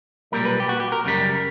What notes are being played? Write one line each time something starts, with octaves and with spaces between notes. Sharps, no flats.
B1 A#2 G3 A#4
B4
G4
F#4
G4
A#4
F#2 C#3 G3